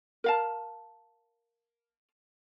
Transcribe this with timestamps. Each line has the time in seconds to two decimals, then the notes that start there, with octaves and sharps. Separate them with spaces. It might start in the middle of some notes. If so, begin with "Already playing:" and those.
0.24 A#4 F5 A5